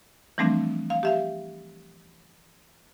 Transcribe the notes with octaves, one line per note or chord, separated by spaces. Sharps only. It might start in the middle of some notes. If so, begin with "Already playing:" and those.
E3 F3 G3 A3 C4 D4
F5
G4 E5 F5